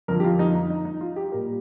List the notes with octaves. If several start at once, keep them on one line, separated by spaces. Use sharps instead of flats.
F2 D3 F3 A#4
G4
F4
D#4
D#4
D#4
D#4
F4
G4
A#2 G3 A#4